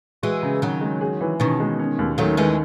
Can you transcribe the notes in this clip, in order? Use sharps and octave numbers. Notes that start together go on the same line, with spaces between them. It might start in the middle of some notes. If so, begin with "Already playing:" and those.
E3 G#3 F#4
C#3
D#3 F#3 C#4
G#3
G#4
E3
B2 D#3 C#4
G#3
C#4
D#2
D#3 F#3 A3
D#3 E3 G#3